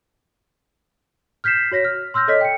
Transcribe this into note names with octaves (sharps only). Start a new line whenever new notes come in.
F6 G6 B6 C7 E7
F#4 C#5 A#6 B6
F6
C6 E6 F6 G6 A#6
A4 C#5 D#5 F6 B6
G5 C#7